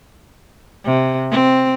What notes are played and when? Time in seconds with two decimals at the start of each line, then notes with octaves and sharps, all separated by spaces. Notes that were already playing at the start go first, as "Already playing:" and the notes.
0.84 C3
1.31 C4